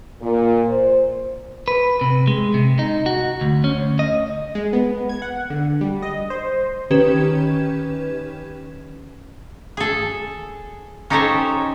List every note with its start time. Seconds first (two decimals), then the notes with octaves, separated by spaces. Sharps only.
0.21 A#2
0.68 C5
1.68 B4
2.01 C3
2.27 G#3
2.54 C3
2.79 D#4
3.06 F#4
3.41 D2
3.64 C#4
3.79 D2
3.99 D#5
4.55 G#3
4.73 B3
5.09 G#6
5.22 F#5
5.50 D3
5.81 G3
6.02 D#5
6.30 C5
6.90 D#3 C#4 G4 B4 G#6 E7
9.77 G#4 A4
11.10 C#4 D#4 G4 A4 C5 C#5